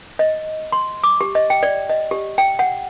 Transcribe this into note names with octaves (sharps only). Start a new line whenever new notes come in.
D#5
C6
D6
G4
D#5
G5
D5
D#5
G4
G5
F#5